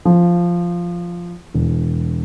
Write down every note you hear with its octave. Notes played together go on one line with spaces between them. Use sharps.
F3
E1